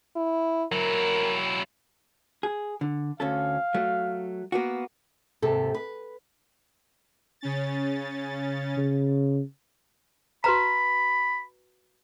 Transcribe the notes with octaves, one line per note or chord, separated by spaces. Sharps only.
E4
F#3 E4 A#4
G#4
D3
D2 C#4 A4 F5
F#3 A3
A#3 B3 F#4
D#2 G#2 C3 A4
B4
C#3 C#4 A6
C#3
F#4 B4 A#5 B5